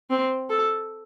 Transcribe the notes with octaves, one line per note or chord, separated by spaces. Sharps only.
C4
A4